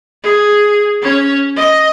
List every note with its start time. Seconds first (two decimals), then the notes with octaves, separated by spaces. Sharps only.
0.23 G#4
1.02 C#4 C#5
1.56 D#5